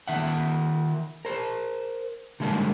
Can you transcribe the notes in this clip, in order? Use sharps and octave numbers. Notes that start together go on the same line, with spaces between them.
D#3 E5 F#5
A#4 C5
D3 G3 G#3 A#3 D4 D#4